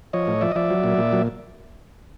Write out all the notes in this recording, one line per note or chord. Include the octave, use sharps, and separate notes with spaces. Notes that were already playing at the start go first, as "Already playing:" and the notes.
F3 C#5 D#5
A2
F3 D5 E5
D#5
F3 D5 E5
F#3
A#2
A#2
F#3